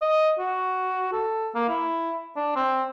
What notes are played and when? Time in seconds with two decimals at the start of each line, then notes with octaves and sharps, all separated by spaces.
0.02 D#5
0.39 F#4
1.13 A4
1.55 A#3
1.69 E4
2.36 D4
2.56 C4